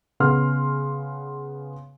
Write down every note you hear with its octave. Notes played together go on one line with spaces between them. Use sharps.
C#3 B3 C6 F6